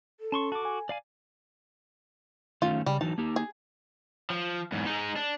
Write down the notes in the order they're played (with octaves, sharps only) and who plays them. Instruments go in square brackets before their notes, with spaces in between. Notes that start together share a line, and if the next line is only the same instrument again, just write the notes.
[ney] A4
[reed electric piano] C#4 [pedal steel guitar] A5 C6 C#6
[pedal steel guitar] F#4 D6 [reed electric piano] A5
[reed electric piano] G#5
[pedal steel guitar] D5 F5 G#5
[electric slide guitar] D#3 A3 C#4 [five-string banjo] F4
[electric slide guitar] C#3 [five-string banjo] G3
[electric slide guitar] E3 F#3 D#4 [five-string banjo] A5
[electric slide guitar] A#3 D#4 G4
[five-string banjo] G#4
[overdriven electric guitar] F3
E2 G#2
G#3 D#4
D4